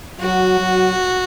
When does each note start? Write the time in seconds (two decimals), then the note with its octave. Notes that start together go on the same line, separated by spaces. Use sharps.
0.20 F#3 F#4
0.59 F#3